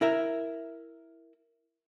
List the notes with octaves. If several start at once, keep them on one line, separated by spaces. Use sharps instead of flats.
E4 A#4 E5